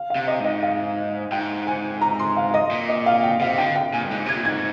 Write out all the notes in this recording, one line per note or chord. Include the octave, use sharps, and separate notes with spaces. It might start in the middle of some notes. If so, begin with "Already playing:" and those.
Already playing: F5
F5
C3
D#5
G#2 D#5
F5
G#2 G5
G#5
A#5
C6
F5
D#5
A#2
D#5
F5
G5
C3 F5
D3 G5
G5
A#2 G#5
G2
G#2
C3 G#6
A#2
G#2 G#6